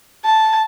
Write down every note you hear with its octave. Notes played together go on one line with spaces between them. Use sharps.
A5